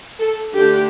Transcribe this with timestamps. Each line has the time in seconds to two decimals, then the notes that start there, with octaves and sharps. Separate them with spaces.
0.20 A4
0.56 D3 A3 D4 G4